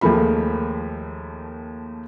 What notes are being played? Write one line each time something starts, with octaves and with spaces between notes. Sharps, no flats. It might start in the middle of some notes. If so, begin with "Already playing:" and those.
D#2 F3 G#3 A3 A#4 B5